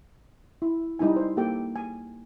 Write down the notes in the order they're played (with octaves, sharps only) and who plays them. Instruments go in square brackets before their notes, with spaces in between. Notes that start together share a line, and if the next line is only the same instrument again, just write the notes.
[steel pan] E4
G3 D#4 E4 G#5
C5
A#3 G4 A4 G5
G#5